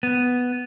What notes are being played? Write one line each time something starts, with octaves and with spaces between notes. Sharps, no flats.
B3